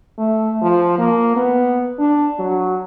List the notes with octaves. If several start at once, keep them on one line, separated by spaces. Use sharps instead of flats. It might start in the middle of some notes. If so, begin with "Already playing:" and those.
A3
F3
A#3
B3
D4
F#3